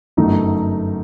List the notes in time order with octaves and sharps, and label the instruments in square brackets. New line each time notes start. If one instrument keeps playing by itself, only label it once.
[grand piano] G1 F#2 F#3 A3 D#4